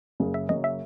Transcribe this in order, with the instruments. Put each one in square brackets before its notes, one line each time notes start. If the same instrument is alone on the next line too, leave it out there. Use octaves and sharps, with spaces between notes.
[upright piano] F#1 F#2 C#3 F#3
[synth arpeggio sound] E5
[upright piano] F#1 F#2 C#3 F#3 [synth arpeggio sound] D#5
[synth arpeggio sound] E5